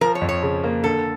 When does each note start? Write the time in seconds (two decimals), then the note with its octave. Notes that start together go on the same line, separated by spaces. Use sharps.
0.01 F3 A#4
0.15 C#5
0.21 F2
0.29 C#5
0.42 C#3
0.63 A#3
0.84 D3 A4